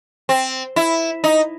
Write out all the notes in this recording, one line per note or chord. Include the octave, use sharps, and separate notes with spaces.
C4
E4
D#4